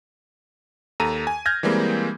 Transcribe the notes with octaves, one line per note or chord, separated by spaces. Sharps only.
D#2 A4 A#5 D#7
G#5
F6 G6 G#6 A#6
E3 G3 G#3 A#3 C4